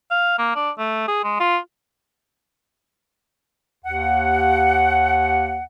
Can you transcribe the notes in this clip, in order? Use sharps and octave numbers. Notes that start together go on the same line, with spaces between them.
F5
A#3
D4
A3
G#4
G#3
F4
D#2 F#5